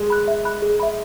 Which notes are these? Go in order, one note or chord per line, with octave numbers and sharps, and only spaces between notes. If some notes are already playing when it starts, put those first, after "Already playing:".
Already playing: G#3
B5 F#6
E5
B5 F#6
G#4
E5 B5